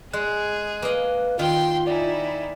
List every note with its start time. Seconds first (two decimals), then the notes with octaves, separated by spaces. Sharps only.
0.13 G#3 G#4 F#6
0.82 A#3 B4 D#5
1.39 D#3 F4 G5 C6
1.87 D#4 E4 D5 G#5